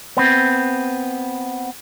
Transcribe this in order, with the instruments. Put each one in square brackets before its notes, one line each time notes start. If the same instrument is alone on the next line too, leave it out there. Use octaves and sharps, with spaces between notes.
[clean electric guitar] B3 C4